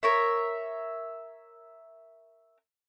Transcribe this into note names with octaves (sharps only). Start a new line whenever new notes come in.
A#4 C#5 E5